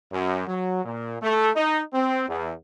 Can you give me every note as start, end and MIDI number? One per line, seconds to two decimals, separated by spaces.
0.13 0.45 42
0.48 0.81 54
0.85 1.18 46
1.22 1.51 57
1.56 1.82 63
1.94 2.29 60
2.29 2.52 40